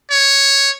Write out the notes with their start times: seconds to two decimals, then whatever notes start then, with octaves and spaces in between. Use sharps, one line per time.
0.11 C#5